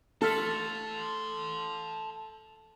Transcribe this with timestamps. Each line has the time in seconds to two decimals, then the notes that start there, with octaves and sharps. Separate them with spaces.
0.22 A3 A4 A5 C6 F6 B6